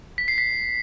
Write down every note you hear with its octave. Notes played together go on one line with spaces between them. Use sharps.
B6
C7
B6